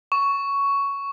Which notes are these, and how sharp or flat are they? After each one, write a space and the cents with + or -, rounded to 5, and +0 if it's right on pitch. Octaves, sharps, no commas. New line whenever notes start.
C#6 +10